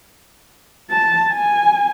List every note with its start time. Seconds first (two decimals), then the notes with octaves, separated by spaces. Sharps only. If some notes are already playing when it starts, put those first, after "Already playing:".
0.90 A5
1.33 G#5